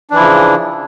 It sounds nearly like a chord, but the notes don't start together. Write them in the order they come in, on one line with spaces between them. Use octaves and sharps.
D4 E3 E4 F3 C#3